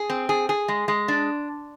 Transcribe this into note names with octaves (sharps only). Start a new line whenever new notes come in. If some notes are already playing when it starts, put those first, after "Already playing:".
Already playing: G#4
C4
G#4
G#4
G#3
G#3
D4